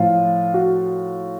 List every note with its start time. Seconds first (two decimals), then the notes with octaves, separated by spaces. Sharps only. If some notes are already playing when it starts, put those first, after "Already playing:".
Already playing: A2 F3 F4
0.54 F#4